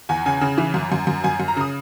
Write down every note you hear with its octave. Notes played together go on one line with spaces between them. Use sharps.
E2 G#5
C#3 G#5
C#3
E3
F#2
F#2
F#2
F#2 G#5
F#2
A#5
C#3 D#6